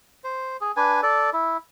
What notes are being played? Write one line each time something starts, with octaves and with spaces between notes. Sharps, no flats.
C5
G#4
D4 B4 G#5
A4 D5
E4